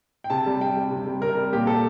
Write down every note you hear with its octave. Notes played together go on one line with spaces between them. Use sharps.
G5
C3 A5
G3
C3 G5
G3
C3
G3
C3 A#4
G3
A#2 G4
G3 A4